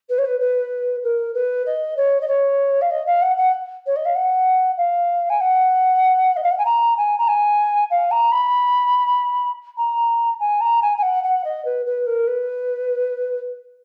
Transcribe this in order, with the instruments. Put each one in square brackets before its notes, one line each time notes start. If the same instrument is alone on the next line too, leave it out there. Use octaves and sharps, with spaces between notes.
[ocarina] B4
C#5
B4
B4
A#4
B4
D#5
C#5
D#5
C#5
F5
D#5
F5
F#5
F#5
C#5
D#5
F5
F#5
F5
G#5
F#5
D#5
F5
F#5
G#5
A#5
G#5
A#5
G#5
F5
A#5
B5
A#5
G#5
A#5
G#5
G#5
F#5
F#5
D#5
B4
B4
A#4
B4